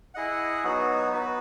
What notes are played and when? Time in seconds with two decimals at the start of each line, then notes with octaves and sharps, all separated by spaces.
0.14 E4 G#4 D#5 F#5
0.64 F#3 B3 D#4 F#4
1.13 B3 F#4 B4